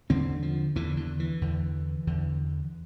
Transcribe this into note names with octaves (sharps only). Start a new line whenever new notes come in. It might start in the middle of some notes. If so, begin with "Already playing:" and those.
E2 D3 C4
F3
E2 D3 E3
D3
E3
E2 D3
E2 D3